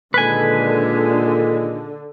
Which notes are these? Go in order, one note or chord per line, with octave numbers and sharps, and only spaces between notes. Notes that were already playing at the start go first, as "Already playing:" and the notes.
A#2 D3 D#3 G#3 B4 G#5